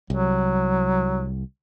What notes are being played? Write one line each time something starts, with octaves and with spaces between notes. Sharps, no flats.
C2 F#3